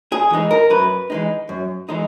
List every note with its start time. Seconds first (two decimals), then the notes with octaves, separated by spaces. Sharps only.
0.12 G#4
0.30 E3 G#3 D#4
0.51 A#4
0.70 F#2 B4
1.10 E3 G#3 D#4
1.49 F#2
1.89 E3 G#3 D#4